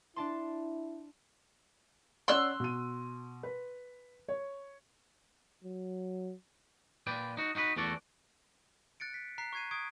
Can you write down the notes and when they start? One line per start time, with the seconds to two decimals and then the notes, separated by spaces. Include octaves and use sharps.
0.16 D4 E4 A5 C6
2.28 C#4 D5 F#5 C6 E6 F#6
2.60 B2 D#7
3.43 B4
4.28 C#5
5.64 F#3
7.07 A#2 B4 D5 G5
7.37 D#4 F#4
7.55 D#4 F#4 G#4 B4
7.77 E2 E3 A3 F#4 D5
9.00 F#6 A6 C#7 D7
9.14 B6
9.38 A#5 F#6 B6 C7
9.53 C#6 F#6 G#6 C7 D#7
9.71 C#6 D#6 G#6 D7